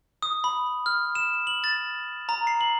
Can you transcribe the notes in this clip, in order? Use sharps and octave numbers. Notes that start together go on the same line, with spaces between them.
D#6
B5
F6
E7
F#7
A6
A#5
C7
F#7